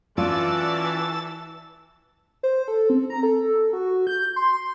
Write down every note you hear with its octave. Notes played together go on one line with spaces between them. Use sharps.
E3 C#4 F4 F#4 D5 A5 E6
C5
A4
C4
A#5
A4
F#4
G6
C6
C6